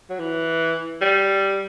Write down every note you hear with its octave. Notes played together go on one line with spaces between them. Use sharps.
F#3
E3
G3